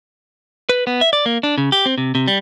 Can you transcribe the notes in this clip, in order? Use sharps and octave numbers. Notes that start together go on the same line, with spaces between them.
B4
B3
E5
D5
A#3
D4
C#3
G4
C4
C3
C3
G3